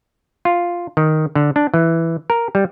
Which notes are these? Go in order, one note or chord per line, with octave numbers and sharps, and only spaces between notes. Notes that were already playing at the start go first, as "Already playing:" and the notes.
F4
D#3
D3
D4
E3
A#4
G3